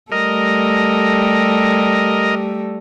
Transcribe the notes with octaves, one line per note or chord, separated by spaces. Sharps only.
G3 A3 A4 A#4 D#5